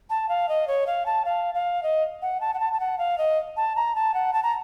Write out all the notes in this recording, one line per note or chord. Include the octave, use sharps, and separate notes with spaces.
A5
F5
D#5
C#5
F5
A5
F5
F5
D#5
F#5
A5
F#5
A5
A5
F#5
F5
D#5
A5
A#5
A5
F#5
A5
A#5